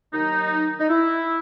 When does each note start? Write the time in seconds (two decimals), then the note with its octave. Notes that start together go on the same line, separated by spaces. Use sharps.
0.13 D#2 D#3 F#3 D#4
0.79 D#4
0.89 E4